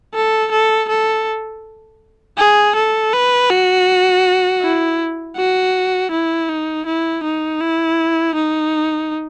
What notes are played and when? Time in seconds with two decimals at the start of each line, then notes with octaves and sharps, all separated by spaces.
0.14 A4
0.52 A4
0.89 A4
2.38 G#4
2.75 A4
3.13 B4
3.50 F#4
4.62 E4
5.37 F#4
6.11 E4
6.49 D#4
6.86 E4
7.24 D#4
7.61 E4
8.35 D#4